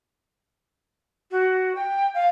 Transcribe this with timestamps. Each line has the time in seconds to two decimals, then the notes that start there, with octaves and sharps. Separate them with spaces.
1.31 F#4
1.75 G5
2.14 F5